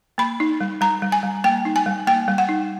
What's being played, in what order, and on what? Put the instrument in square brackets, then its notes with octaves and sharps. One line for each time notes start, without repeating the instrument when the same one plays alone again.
[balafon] A#3 B5
D#4
G3
G3 A#5
G3
G#5
G3
A#3 G5
D#4
G#5
G3
A#3 G5
G3
F#5
D#4